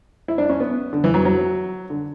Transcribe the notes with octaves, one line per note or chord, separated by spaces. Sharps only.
E4
D4
C#4
B3
D3
E3
F#3
F#3
D3